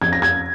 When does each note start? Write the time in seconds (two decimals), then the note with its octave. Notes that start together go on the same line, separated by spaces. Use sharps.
0.02 F2 G#6
0.12 A#6
0.22 G#6